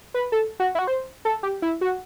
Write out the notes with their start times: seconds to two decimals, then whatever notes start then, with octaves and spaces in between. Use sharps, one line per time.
0.14 B4
0.32 A4
0.60 F#4
0.75 E4
0.79 F#4
0.87 C5
1.25 A4
1.43 G4
1.62 E4
1.81 F#4